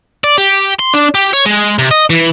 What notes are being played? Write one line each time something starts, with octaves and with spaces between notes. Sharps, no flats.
D5
G4
C6
D4
G4
C#5
G#3
C3
D#5
E3